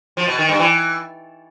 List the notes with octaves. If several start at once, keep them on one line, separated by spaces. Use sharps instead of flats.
F3
B2
D#3
G2
E3